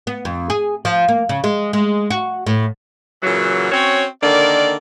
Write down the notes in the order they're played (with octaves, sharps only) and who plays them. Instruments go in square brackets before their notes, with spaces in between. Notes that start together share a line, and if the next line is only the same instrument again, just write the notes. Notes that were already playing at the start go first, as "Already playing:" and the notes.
[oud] B3
F2
G#4
F3
A#3
C#3
G#3
G#3
F#4
A2
[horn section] A#2 C#3 E3 F#3
C4 C#4 F#4 C#5
D3 D#3 A#3 D5